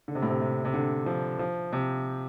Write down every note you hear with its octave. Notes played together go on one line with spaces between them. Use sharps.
D3
C3
A2
C3
C3
C3
D3
F3
F3
C3